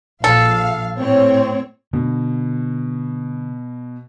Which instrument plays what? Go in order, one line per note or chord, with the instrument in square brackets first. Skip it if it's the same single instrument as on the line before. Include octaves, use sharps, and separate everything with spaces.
[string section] A#1 F5 [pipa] A4
[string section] A2 C4 C#5
[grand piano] B2 [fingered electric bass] D3